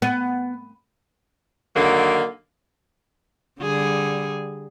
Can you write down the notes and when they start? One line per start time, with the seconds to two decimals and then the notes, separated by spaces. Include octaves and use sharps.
0.02 B3
1.76 D3 D#3 F#3 A#3
3.61 D3 G3 G#4